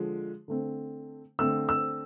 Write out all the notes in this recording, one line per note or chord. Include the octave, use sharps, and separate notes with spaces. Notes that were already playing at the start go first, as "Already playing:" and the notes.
Already playing: D3 F3 G#3
D3 A3 C4
D3 A3 C4 E6
E6